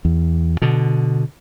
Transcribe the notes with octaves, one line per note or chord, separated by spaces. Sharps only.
E2
B2 D3